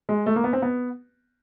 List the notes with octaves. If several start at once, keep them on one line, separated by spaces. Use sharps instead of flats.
G#3
A3
A#3
B3
C4
B3